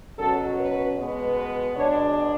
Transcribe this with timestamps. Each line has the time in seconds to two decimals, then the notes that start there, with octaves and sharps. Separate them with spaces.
0.18 B2 F#3 C#4 A4
0.58 B4
0.97 B2 G#3 B3
1.36 B4
1.74 B2 G#3 D4 C#5